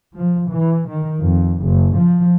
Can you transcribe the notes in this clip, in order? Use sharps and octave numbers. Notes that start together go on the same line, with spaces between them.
F3
E3
D#3
F2
F#1
F3